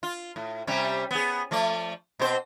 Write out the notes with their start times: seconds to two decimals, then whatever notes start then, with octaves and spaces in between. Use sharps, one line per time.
0.03 F4
0.36 A2
0.67 C3 G3 C#4
1.11 B3 G#4
1.51 F3 A3 D5
2.19 B2 C4 C5